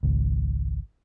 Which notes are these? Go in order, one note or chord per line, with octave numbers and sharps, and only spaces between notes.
G#1 C#2